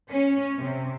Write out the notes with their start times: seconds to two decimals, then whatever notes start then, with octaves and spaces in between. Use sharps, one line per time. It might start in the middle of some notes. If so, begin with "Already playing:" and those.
0.11 C#4
0.58 C3